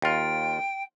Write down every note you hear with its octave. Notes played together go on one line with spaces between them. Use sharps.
D#2 F4 G5